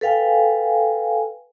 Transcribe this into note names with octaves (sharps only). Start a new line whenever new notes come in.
A4 B4 F5 G5 G#5